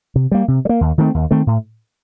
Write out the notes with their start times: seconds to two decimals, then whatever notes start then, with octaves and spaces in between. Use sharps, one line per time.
0.16 C3
0.32 G3 A#3
0.48 C3
0.65 G3
0.69 A#3
0.81 D#2
0.98 D#3 A3 C4
1.14 D#2
1.31 D#3 A3 C4
1.47 A2